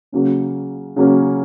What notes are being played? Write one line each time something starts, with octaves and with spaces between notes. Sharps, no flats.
C#3 F#3 A#3 C#4
C#3 F#3 A#3 C#4